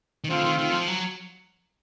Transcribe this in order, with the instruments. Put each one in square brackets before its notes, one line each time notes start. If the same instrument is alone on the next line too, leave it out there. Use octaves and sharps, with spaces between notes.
[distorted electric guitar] D#3
[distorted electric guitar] D3 [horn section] A3 C4 F4
[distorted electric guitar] E3
D#3
D#3
F3
F#3